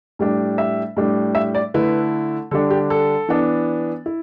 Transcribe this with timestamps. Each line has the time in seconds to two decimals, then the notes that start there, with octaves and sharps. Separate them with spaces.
0.19 A2 G3 D4
0.58 E5
0.97 A2 G3 D4
1.35 E5
1.55 D5
1.74 D3 A3 E4 B4
2.51 D3 G3 D4 A4
2.71 G4
2.90 A4
3.29 E3 B3 D4
4.06 E4